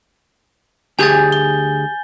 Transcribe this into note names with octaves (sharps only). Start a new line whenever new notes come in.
D2 G4 G#4 G#5 G6 A6
G7